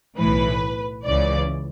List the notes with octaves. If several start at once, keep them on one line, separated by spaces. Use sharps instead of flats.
B1 A2 E3 B4
C#2 C#3 E3 D5